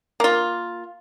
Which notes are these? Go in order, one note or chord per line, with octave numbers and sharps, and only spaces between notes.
A#3 F4